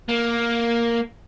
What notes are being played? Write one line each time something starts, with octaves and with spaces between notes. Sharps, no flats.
A#3